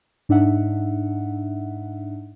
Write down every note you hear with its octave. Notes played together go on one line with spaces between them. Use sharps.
G#2 D4 D#4 E5 F#5